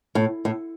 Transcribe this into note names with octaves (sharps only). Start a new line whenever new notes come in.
A2
A2